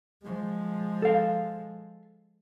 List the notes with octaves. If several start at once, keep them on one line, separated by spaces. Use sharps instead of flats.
F3 G#3
A4 F5